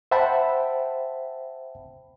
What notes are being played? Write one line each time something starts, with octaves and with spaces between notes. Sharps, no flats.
C5 E5 F#5 G5 A5 B5